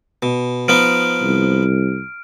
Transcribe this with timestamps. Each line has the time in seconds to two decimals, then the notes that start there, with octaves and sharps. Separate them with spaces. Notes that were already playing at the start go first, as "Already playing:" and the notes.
0.23 B2
0.68 F3 B3 D#4 F6 D7
1.22 C2